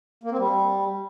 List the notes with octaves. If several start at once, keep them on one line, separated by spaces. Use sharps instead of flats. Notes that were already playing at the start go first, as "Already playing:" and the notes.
A#3
C4
G3